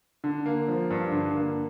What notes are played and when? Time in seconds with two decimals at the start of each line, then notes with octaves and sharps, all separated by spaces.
0.24 D3
0.46 A#3
0.68 F3
0.90 G2
1.12 D3
1.35 A#3